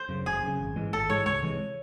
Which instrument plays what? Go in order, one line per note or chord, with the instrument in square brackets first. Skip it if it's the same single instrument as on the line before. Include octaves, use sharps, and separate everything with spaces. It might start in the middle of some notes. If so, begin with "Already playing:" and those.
Already playing: [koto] C5
[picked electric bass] F#2 C#3
[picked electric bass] F#1 [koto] G#4
[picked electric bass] F#2 C#3
G#1
G#2 E3 G#3
[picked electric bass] G#1 [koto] A4
[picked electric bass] G#2 E3 G#3 [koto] C#5
[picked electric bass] C#2 [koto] C#5
[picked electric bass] C3 E3 G#3